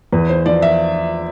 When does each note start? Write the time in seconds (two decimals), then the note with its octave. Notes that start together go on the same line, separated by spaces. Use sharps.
0.13 E2 B4
0.29 C5
0.46 F3 D5
0.62 E5